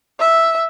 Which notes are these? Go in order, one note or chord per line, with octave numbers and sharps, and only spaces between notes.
E5